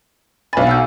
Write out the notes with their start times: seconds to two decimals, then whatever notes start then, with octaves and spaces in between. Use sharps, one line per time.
0.53 B1 G#5 B5 A6
0.67 F#5 E6 G6